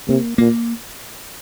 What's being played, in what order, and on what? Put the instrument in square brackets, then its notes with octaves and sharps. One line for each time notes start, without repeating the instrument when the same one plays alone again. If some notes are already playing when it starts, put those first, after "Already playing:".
[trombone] C3 [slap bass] A#3
[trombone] A#2 [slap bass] A#3